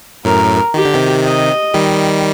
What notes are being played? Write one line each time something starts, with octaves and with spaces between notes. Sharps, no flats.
F#2 A2 A#4
D#3 G4
D3
C3 D#3
D#5
D#3 G3